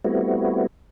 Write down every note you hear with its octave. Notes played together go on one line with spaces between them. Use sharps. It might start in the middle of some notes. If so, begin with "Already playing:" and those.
G3 A3 B3 C4 E4 F#4